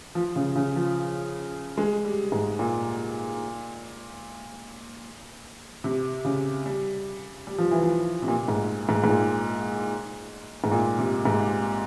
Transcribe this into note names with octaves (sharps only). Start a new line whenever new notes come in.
F3
C#3
C#3
F3
G#3
G3
G#2
A#2
C3
C#3
G3
G3
F3
E3
F3
C3
A#2
G#2
G#2
G#2
A#2
G#2
A#2
C3
G#2